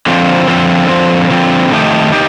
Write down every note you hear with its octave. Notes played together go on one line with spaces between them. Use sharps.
D3 F3 C4
D3 F3 C4
D3 F3 C4
D3 F3 C4
F2 D#3 A3 D#4 G4
D#4 G4